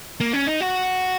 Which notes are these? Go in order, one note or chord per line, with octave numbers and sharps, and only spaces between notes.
A#3
C#4
D#4
F#4